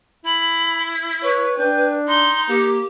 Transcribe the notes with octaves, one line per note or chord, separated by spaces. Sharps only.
E4 B5
B4 C#5
D4 G5
D#4 C6
A#3 G4